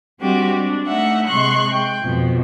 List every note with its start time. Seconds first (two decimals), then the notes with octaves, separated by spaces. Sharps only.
0.20 G3 G#3 C4 D4 F#4 G4
0.55 D4
0.87 A3 D#4 E5 F#5
1.27 C3 G#3 C6 C#6 F#6
1.72 G5
2.02 F2 B2 F3